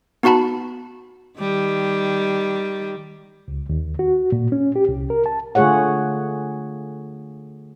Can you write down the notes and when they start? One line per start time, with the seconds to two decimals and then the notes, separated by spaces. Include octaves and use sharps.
0.23 B3 D#4 F#4 F#5 A5 B5
1.39 D#3 G3
3.48 C#2
3.69 D#2
3.99 F#4
4.32 A#2
4.52 C#4
4.76 G4
4.89 C2
5.10 A#4
5.26 A5
5.55 D3 A3 F4 G#4 C#5 F#5